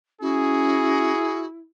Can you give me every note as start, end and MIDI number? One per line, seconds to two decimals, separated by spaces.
0.21 1.12 61
0.21 1.67 64
0.21 1.45 66
0.21 1.48 68